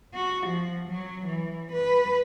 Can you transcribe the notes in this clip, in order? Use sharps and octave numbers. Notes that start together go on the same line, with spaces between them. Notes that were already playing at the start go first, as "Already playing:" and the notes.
F#4
F3
F#3
E3
B4